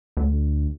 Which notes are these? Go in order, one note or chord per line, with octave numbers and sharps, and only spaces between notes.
D2